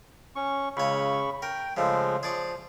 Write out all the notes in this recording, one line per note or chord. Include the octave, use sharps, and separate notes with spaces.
C#4 C#6
C#2 C#3 C#5 B5 C#6
A#4 G5
C#3 F3 G#3 A3
F3 G#4 D5 C#6